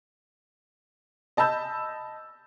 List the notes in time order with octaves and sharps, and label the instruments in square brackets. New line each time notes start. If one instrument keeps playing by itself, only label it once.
[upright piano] D#5 A5 B5 E6 G6